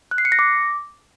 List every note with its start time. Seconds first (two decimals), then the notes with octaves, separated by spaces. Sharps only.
0.11 F#6
0.18 C7
0.25 C#7
0.32 A#6
0.39 D6